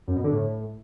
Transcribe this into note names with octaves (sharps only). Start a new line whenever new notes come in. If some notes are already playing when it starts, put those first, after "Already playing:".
F#2
B2
D3
A2